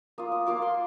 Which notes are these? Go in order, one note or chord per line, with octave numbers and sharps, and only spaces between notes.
A#3 F4 D#6
D#6
A#3 F4 D6
C6